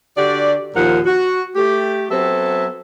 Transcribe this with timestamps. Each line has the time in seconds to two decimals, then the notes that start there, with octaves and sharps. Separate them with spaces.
0.17 D3 F#4 G4 D5
0.75 D#2 A#2 F3 A#4 F#5
1.06 F#4
1.56 A3 G4
2.11 F#3 B3 C4 A4 E5